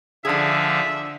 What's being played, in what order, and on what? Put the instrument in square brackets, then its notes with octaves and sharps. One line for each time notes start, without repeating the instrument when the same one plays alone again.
[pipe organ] D3 F3 [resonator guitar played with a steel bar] D4 G#4 [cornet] E5